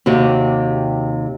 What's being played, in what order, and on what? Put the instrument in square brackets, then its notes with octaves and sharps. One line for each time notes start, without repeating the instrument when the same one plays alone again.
[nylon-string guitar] D#2 C3 F#4 G4